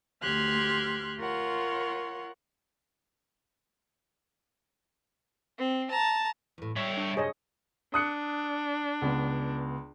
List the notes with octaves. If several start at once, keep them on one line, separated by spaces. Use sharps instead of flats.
D2 G4 C6 F6 F#6 G#6
F4 A#4 C#5 F#5 C6
C4
A5 A#5
E2 A2
G3 C#5 E5
D4
F#2 C3 G#4 C5 C#5 D#5
D4 D#6 F#6 C#7
C#2 B3